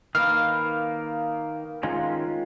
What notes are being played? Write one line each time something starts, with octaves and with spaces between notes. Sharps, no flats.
D#3 A#3 B4 F5
D#3 G#3 C#4 F4